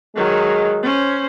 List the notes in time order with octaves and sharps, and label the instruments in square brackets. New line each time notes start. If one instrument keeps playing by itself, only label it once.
[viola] D#3 F#3 [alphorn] G#3
[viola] C#4 C5